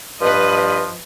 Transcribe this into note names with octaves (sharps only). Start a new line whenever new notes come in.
G2 F3 B4 D#5